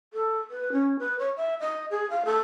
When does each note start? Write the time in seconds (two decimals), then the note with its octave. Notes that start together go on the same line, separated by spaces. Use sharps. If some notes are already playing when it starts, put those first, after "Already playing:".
0.13 A4
0.50 B4
0.72 C#4
0.99 B4
1.19 C#5
1.37 E5
1.60 D#5
1.91 G#4
2.10 F5
2.25 A4